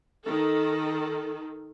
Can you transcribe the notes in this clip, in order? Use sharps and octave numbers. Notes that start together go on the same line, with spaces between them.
D#3 A4